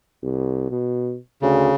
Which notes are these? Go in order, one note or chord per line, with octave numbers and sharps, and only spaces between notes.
C2
B2
D2 C#3